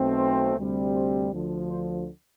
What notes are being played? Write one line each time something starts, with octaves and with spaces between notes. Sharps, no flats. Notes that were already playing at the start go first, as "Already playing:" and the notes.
Already playing: B1 B2 A3 C4
C5
D2 C3 G3 C4
C5
D2 D3 F3
C5